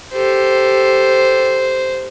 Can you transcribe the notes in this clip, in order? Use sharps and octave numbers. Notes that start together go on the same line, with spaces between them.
G4 A4 C5